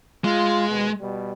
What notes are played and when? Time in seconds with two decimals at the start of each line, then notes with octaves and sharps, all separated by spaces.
0.24 G#3 F4
0.69 D#2 B2
1.00 B2 G3